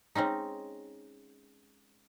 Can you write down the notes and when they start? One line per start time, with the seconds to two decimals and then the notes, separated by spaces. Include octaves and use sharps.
0.15 G#3 C4 C#4 D#4